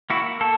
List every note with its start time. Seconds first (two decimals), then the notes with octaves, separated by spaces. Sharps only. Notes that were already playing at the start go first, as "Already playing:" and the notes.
0.10 A#3 E4 F#4
0.41 A#3 A4